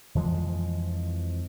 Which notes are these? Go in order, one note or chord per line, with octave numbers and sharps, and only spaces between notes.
F2 E3 F3 G#3